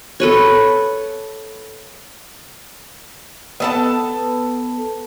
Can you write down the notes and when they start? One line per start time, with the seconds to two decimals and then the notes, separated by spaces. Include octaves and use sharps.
0.20 A4 B4 C#5
3.60 B3 A4 A5